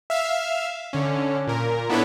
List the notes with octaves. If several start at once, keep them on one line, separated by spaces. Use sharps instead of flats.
E5 F5
D3 C#4
A#2 A#4
B3 D4 E4 A4 B4 C#5